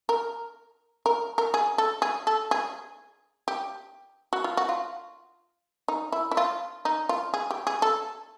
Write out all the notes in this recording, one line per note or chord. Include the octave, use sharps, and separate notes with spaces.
A#4
A#4
A#4
G#4
A4
G#4
A4
G#4
G4
F#4
F4
F#4
F4
D#4
E4
E4
F4
D#4
F4
G#4
G4
G#4
A4